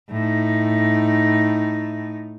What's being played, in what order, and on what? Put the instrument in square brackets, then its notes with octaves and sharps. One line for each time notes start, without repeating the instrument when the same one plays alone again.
[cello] A2 D#4